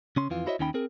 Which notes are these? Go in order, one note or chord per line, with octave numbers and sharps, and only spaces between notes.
C#3 C#4 C6
F2 E3 F4
E4 F#4 C5 C#5 D#5 E5
D#2 D#3 C#4 D#4 G5 B5
C4 G#4 A#4